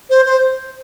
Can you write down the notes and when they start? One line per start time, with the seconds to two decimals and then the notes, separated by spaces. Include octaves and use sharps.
0.10 C5
0.26 C5